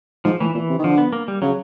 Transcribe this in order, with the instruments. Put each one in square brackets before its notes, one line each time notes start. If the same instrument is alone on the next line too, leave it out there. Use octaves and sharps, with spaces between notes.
[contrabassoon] G#2 [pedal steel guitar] F3
[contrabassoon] A2 [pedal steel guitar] E3
[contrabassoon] A#2 [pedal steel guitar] E3
[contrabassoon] C3
D#3
[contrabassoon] D3 [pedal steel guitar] F3
[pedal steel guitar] B3
A#3
G3
[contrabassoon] C#3 [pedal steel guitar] F#3